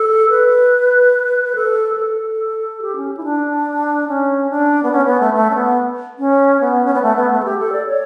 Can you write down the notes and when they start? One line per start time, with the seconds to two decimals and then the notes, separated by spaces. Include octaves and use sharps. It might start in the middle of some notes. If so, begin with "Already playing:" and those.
Already playing: A4
0.29 B4
1.55 A4
1.93 B4
1.97 A4
2.82 G4
2.96 C#4
3.17 E4
3.23 D4
4.08 C#4
4.50 D4
4.83 B3
4.92 C#4
5.06 B3
5.20 A3
5.34 A3
5.50 C#4
5.55 B3
6.19 C#4
6.60 B3
6.85 C#4
6.94 B3
7.02 A3
7.16 B3
7.31 A3
7.40 A4
7.45 G4
7.58 A4
7.72 D5
7.87 C#5